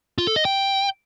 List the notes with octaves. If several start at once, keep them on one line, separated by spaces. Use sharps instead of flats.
F4
A4
D#5
G5